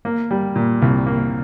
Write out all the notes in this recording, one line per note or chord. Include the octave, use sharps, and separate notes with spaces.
A#3
G3
A#2
C2
A#3